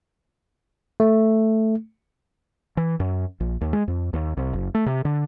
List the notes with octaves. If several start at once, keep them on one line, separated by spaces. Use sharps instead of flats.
A3
E3
F#2
A#1
D#2
G#3
F2
D#2
C2
F#1
A3
C3
D3